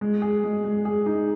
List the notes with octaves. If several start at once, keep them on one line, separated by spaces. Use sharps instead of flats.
G#3
G#4
G#3
G#3
G#4
D#4